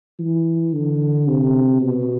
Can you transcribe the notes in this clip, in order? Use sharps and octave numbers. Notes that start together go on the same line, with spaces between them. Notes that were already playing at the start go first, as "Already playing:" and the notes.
E3
D3
C3
B2